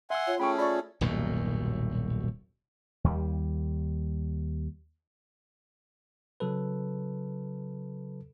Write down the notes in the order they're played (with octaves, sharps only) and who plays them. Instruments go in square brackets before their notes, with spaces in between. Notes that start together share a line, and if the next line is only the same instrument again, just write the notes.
[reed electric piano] E5 E6 [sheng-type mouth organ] F#5 G#5 C6
[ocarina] F4 [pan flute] C#5
[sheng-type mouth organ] A3 C#4 G#4 [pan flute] G5 [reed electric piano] B5 C#6
[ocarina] F4 [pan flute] D5 [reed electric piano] B5 C#6
[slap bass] D#1 B1 F#2 A2
D#2 G3
[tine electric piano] C#3 F#3 A4 B4